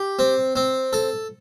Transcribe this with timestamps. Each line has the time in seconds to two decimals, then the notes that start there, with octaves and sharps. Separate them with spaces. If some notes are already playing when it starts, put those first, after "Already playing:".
Already playing: G4
0.19 C4
0.56 C4
0.93 A4